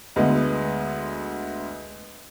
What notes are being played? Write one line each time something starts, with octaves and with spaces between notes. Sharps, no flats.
D2 G#3 B3